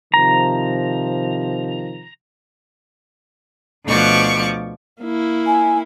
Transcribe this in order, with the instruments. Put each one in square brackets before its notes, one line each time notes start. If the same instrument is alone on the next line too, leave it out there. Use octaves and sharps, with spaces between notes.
[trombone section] C3 D#3 F3 [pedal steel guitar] A#5
[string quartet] D2 B2 F3 C#6 D6
[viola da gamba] A#3 E4
[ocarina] G#5